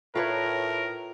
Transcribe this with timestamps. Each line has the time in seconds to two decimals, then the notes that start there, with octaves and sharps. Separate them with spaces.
0.15 A2 F4 A#4 B4 C#5